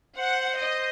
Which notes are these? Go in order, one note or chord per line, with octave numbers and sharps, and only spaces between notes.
C5 F#5
D#5